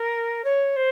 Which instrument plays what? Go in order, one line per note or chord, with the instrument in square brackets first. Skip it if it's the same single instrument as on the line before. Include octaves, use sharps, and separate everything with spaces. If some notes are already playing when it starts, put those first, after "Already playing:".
Already playing: [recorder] A#4
C#5
C5